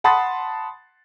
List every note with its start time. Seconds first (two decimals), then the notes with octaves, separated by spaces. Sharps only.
0.04 F#5 A5 B5 C6 D#6 A6